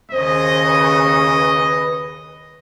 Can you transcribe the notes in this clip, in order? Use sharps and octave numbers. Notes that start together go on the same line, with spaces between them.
D#2 C#3 C5 D#5
B4